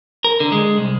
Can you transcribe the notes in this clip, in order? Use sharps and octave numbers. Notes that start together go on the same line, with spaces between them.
A#4
D3
G#3
C2